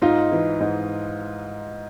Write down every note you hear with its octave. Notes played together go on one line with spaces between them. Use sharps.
G#2 D#4 F4
E3
G#2